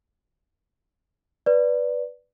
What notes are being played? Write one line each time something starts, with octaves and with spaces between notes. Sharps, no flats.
B4 D5